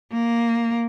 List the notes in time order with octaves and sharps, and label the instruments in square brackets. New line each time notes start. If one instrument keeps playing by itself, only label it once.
[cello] A#3